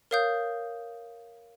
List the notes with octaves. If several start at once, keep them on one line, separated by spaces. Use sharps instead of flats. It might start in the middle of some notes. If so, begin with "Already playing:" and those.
A#4 C#5 F5 D#6 G6